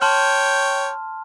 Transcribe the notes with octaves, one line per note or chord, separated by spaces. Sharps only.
C#5 G5 A5 C6 F6